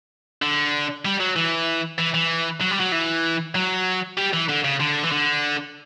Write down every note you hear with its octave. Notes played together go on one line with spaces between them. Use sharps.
D3
G3
F#3
E3
E3
E3
F#3
G3
F#3
E3
F#3
G3
E3
D3
C#3
D3
E3
D3